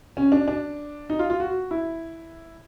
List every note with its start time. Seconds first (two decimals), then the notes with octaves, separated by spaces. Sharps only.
0.17 C#4
0.32 D4
0.48 D4
1.10 D#4
1.19 F4
1.30 F4
1.40 F#4
1.71 E4